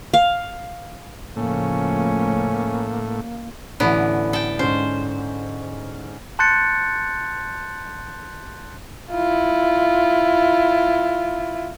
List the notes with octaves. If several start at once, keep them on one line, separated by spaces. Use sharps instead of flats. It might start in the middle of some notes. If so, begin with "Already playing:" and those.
F5
A2 C#3 F3 A3 A#3 C#4
A1 D3 E3 B3 E4
A4 G5
G#2 C#4 C5
A5 C6 F#6 G6 A6 C#7
E4 F4